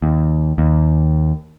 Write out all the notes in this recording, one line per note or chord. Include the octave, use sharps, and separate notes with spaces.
D#2
D#2